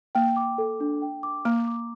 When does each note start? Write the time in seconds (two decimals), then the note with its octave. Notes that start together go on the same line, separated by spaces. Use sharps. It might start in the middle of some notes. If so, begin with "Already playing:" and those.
0.15 A#3 G5
0.37 D6
0.58 A4
0.80 D4
1.02 G5
1.23 D6
1.45 A#3 A#5
1.67 D6